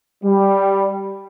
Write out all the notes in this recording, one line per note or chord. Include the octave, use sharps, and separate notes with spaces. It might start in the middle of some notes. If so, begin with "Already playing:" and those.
G3